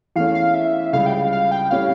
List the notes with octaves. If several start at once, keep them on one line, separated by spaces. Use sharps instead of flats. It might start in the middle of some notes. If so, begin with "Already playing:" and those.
E2 E3 A3 C#4 F5
F5
E5
C#2 C#3 G3 F5
G5
F5
F5
G5
A2 G3 C#4 G4 F5